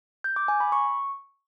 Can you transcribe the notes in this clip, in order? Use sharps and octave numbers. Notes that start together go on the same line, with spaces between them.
G6
D6
G#5
B5
C#6